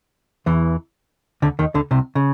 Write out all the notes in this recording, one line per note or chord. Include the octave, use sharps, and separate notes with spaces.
E2 E3
D2 D3
D#2 D#3
D2 D3
C2 C3
C#3